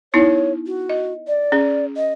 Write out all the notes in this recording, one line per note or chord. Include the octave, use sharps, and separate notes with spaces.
B3 D#4 E4 C#5
F#4
D#5
D5
C#4 G#4
D#5